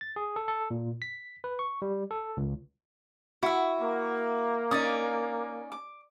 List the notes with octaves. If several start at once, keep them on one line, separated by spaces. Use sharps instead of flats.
A6
G#4
A4
A4
A#2
B6
B4
C#6
G3
A4
C#2
E4 F#4 E5
A#3
C#4 D#4 D5 D#6
D6